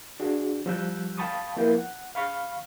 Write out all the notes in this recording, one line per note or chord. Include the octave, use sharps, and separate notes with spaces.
D4 F#4 G#4
F3 G3 E6 F#6 G6
F5 G5 A5 B5 C#6 D#6
F3 A#3 B3 E4 A#4 G6
F#5
F5 B5 C#6 F6